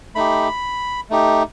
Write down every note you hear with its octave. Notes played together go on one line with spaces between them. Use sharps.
A3 D#4 G4 B5
A3 D#4 G4